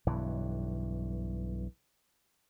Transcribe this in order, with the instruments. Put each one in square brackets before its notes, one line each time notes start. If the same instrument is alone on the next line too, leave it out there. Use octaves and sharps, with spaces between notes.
[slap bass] B1 G2 E3